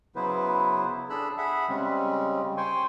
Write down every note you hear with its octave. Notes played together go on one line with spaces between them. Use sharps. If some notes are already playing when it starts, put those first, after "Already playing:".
C#3 F#3 B3 E4 B4 C5
D4 G#4 A4 B5 E6 F#6
G#4 E5 F#5 B5
C#3 G3 G#3 C4 C#4
C5 G5 G#5 C6 C#6